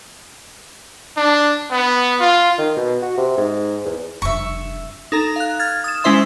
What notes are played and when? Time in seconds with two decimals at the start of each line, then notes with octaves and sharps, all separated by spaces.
1.17 D4
1.70 B3
2.20 F4
2.58 D#3
2.76 B2
3.02 F#4
3.17 C3
3.37 G#2
3.85 E2
4.22 F1 G2 E5 C#6
5.12 D#4 A4 A#5
5.36 F5 F#6
5.59 F6 G#6 A6
5.84 D#6 E7
6.04 G#3 C#4 E4 C5 E5 C6